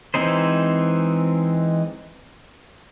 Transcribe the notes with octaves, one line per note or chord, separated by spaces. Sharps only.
E3 G#3 C4 D#4 C5